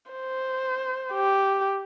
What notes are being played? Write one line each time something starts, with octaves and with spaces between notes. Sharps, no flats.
C5
G4